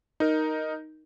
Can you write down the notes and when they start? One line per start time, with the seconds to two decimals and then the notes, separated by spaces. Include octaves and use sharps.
0.20 D#4 A#4